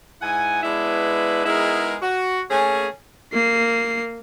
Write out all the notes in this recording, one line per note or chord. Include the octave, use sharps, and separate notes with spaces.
G#2 E4 F#5 G#5
G#3 B3 D4 E4 B4
G#3 B3 D#4 E4 G#4 A#4
F#4
A3 A#3 C#4 G#4 G#5
A#3 C7